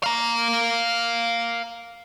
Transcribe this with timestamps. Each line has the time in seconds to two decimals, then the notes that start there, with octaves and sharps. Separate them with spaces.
0.03 F5 A#5